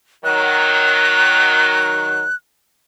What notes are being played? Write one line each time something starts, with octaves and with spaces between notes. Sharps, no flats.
D#3 F#3 F#6